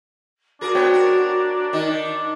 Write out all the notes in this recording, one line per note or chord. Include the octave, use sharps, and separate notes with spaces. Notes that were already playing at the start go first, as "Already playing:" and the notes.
D4 F#4 G#4 A#4
B3 C5 C#5 G5
A#4
D#3